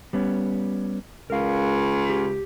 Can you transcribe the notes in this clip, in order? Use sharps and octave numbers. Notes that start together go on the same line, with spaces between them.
G3 B3 C#4
C#2 A#4 F5
G4